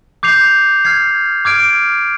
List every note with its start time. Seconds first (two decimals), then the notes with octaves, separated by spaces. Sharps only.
0.23 D6 G6 C7 F7
0.85 F6 G#6 C7
1.45 D6 F6 G#6 D7